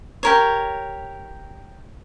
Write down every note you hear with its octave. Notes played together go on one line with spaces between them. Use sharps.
G4 A#4 C#5